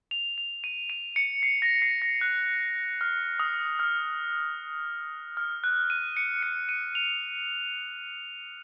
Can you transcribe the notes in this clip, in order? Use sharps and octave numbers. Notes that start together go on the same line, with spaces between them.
F7
F7
D#7
D#7
C#7
C7
A#6
C7
A#6
F#6
F6
D#6
F6
F6
F#6
D#7
C#7
C#7
D#7
F7